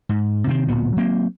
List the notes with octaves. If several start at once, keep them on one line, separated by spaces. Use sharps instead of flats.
G#2
C3 D#3 F3 C4
D1 A#2 B3
F#3 A#3 C4